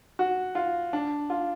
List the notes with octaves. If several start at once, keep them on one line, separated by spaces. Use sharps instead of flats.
F#4
F4
D4
F4